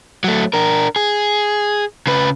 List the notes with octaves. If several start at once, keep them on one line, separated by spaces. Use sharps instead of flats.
F#3 A3
D4 A#4
G#4
C#3 B4